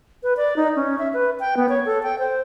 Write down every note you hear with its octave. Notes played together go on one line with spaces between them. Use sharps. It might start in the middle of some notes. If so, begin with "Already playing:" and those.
B4
D5
D#4
C#4
E5
B4
G5
B3
C#5
A4
G5
C5